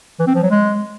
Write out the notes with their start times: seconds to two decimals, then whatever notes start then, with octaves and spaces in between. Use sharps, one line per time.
0.20 E3
0.27 C4
0.35 F3
0.43 F#3
0.51 G#3